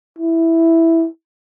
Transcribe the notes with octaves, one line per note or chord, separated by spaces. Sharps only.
E4